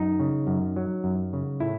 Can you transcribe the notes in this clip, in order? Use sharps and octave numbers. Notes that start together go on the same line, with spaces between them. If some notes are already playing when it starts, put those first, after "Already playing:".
Already playing: F#2 D#4
C#3
F#2
F#3
F#2
C#3
A2 E4